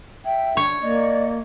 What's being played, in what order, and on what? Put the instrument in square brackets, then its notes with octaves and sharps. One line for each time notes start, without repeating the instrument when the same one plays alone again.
[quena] E5 [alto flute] G5
[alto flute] D4 [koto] C#5
[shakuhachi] A#3 [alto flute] D5 [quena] D#5